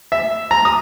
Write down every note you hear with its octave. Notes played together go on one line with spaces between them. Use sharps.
E5
A#5
D#6